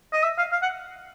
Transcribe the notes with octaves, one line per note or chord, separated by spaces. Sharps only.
D#5
E5
F5
F5
F#5